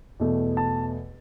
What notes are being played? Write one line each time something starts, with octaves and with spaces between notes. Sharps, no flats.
E2 B2 A3
A5